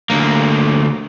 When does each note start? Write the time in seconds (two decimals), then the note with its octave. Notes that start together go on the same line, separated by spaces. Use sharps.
0.10 D2 A#3